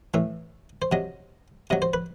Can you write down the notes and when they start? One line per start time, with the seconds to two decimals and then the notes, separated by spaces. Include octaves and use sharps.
0.14 A2 E3 E5
0.82 C5
0.92 C3 F#3 D#5
1.70 C3 F#3 D#5
1.82 C5
1.94 B4